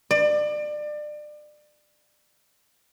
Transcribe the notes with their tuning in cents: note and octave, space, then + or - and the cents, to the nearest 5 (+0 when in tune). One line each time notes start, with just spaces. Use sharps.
D5 +30